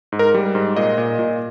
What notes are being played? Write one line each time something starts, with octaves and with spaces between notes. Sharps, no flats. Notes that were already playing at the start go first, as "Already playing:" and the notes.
G#2
A#4
G3
G#2
A#2 D#5
A#2
A#2